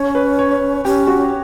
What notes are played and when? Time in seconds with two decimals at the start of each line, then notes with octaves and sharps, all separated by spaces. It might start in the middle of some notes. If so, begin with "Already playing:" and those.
Already playing: C#4 C#5
0.15 B4
0.39 C#5
0.85 C#4 G4
1.07 F#4